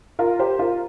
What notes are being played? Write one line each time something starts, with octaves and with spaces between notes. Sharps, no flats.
F4 A#4
G4 C5
F4 A#4